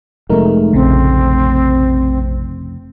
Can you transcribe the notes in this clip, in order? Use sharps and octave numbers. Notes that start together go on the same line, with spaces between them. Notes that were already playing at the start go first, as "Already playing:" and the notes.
F1 G#3 A3 D#4 A#4
A#1 C#3 C4